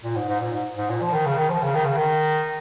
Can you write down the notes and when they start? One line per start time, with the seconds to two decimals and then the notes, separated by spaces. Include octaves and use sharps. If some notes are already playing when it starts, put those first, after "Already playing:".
0.04 A#2
0.16 G#2
0.28 G#2
0.40 A#2
0.52 G#2
0.77 G#2
0.90 A#2
1.01 F3
1.14 D#3
1.26 C#3
1.38 D#3
1.50 F3
1.63 C#3
1.75 D#3
1.85 C#3
1.96 D#3